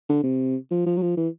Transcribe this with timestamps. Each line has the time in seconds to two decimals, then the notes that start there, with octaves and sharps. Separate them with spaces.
0.09 D3
0.23 C3
0.71 F3
0.86 F3
0.97 F#3
1.02 F3
1.17 E3